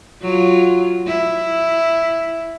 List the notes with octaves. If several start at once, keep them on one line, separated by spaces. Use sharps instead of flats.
F#3 F4
E4